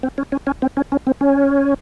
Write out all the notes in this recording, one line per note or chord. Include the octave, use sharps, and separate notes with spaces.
C4
C#4
C#4
C#4
C4
C#4
C#4
C4
C#4